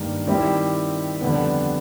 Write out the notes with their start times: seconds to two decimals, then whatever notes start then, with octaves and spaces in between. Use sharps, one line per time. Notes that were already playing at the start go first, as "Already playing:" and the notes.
Already playing: G2 D#3 G3 A#3 D4
0.27 D#3 G3 C4 E4 G4
1.21 F2 D3 G3 B3